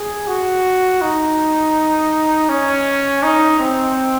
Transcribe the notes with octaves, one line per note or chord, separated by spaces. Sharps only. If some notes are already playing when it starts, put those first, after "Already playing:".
Already playing: G#4
F#4
D#4
C#4
D#4
C4